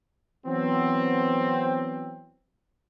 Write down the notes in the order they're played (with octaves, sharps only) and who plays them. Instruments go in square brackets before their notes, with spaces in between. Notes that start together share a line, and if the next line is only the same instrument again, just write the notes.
[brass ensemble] E3 F#3 B3 C4